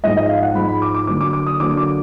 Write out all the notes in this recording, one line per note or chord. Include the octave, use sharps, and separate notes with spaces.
G#2 F3 G#3 D#5
D#5
F5
F#5
G#2 F3 G#3 B5
B5
D6
D6
D3 F#3 A#3 D6
D6
D6
D#6
D3 F#3 A#3 D6
D6